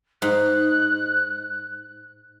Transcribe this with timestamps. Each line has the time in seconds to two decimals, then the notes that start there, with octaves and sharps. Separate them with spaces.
0.22 G#2 F#6